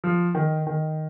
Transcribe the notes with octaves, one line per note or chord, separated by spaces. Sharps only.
F3
D#3
D#3